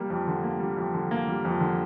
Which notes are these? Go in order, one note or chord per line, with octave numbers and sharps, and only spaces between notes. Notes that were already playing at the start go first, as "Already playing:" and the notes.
Already playing: G3 A#3
F2
D3
A#3
G3
F2
D3
A#3
G3
F2
D3